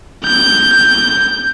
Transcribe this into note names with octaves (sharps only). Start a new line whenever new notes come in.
G6